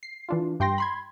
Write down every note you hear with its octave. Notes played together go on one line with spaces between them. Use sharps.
C7
E3 D4 F4
G2 G5 C6 A#6
B5 C6 G#6